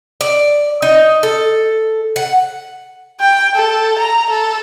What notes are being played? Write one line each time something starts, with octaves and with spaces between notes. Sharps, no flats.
D5
D#4
A4
F#5
G5
A4
A#5
A4